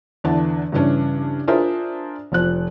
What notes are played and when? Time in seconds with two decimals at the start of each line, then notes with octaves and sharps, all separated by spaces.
0.24 E2 D3 E3 D4 A5
0.72 G2 C#3 E3 C#4 D4
1.48 D4 F4 G#4 A#4 C5 E5
2.32 F1 F3 F#6